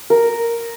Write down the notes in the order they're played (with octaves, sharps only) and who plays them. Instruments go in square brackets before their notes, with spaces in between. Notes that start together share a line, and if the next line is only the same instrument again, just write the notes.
[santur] A#4